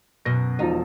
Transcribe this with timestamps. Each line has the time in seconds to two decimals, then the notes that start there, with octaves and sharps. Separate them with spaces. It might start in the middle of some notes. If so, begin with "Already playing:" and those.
0.25 F#2 B2 A#6
0.59 E1 F3 D#4